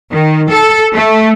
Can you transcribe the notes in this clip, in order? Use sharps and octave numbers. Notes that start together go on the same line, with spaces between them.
D#3
A4
A3